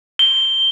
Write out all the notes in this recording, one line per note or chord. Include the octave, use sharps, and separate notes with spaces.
G7